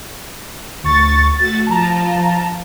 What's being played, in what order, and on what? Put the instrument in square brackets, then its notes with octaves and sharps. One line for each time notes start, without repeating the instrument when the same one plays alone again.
[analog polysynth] D2 C#6 A6
[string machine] A3 F#4 [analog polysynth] A6
[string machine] F3 F4 [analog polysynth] A5 A#5